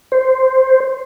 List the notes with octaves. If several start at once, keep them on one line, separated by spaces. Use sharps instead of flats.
C5